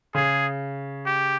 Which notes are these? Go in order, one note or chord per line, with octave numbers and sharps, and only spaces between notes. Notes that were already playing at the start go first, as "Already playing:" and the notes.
C#3 G#4
G4